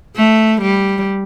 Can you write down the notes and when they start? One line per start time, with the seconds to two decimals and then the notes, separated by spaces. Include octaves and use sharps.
0.16 A3
0.62 G3